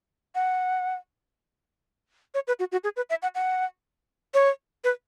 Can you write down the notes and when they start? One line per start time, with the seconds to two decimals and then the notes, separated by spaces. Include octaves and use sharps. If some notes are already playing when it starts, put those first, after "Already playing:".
0.35 F#5
2.34 C#5
2.47 B4
2.59 F#4
2.72 F#4
2.84 G#4
2.96 B4
3.10 E5
3.22 F#5
3.35 F#5
4.34 C#5
4.84 B4